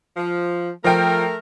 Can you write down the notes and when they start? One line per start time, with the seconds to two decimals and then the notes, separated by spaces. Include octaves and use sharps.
0.17 F3
0.84 F3 A3 A#4 G5